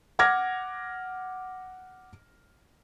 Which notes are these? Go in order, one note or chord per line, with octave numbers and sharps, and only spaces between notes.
F#5 D6 F6 G#6 A#6